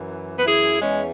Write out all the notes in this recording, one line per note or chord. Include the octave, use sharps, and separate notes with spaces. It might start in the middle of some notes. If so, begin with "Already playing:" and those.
Already playing: F#2 E3
B4
E4 G#4
E2 E3 G#3 C#4